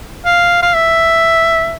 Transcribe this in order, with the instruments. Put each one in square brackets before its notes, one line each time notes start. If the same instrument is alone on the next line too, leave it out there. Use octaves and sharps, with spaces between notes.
[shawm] F5
F5
E5